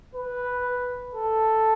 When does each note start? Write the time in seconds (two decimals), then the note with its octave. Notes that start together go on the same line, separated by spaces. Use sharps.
0.15 B4
1.15 A4